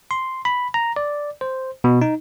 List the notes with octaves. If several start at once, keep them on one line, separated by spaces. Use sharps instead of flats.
C6
B5
A#5
D5
C5
B2
D#4